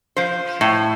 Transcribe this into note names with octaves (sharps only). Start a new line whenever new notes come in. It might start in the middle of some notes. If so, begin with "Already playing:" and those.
F3 C5
A2